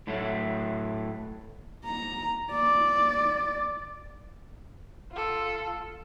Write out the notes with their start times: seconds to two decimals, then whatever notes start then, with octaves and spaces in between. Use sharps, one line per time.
0.07 A2 F#3 A3
1.85 A#5
2.51 D5
5.11 F4 A4